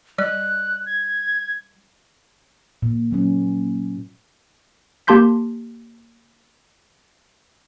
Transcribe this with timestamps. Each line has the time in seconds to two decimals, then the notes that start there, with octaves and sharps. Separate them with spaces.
0.18 G3 D5 F#6
0.86 G#6
2.82 A#2
3.11 F#3 A#3 C#4
5.07 A#3 G4 A5 C6 G6 B6